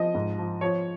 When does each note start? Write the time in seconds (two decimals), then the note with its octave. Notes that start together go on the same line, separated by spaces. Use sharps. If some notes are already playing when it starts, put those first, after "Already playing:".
Already playing: F3 D#5
0.15 G#2
0.39 F3
0.61 F3 C#5